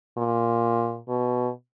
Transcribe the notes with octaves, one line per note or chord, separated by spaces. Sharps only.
A#2
B2